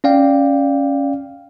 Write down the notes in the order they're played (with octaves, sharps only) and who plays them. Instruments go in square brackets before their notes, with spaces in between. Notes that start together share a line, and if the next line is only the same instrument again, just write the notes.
[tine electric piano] C#4 D5 F5 G5